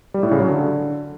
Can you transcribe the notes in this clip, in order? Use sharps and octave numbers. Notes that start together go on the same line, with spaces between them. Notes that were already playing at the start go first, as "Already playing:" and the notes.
G3
A2
C#3
F#3
D3